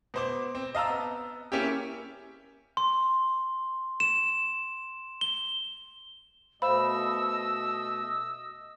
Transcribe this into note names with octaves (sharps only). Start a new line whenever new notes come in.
B2 C5 D6
C4
D#5 F5 A5 A#5 E6
B3
A#3 C#4 E4 G4
C6
E7
G7
B2 A3 C5 D#5 F5 B5 E6